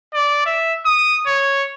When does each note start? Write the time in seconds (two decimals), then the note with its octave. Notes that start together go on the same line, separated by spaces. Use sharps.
0.14 D5
0.46 E5
0.86 D#6
1.27 C#5